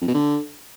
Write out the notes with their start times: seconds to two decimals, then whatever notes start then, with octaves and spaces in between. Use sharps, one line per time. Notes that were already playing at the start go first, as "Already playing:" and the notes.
0.02 F2
0.08 B2
0.14 D3